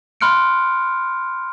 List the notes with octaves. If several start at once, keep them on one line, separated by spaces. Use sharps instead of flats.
B5 C6 F6 F#6 C#7 D7